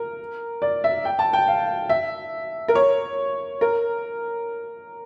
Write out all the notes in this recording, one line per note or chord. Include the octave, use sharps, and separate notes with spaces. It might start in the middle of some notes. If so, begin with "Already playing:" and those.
Already playing: A#4
D5
E5
G5
A5
G5
F5
E5
A#4
C#5
A#4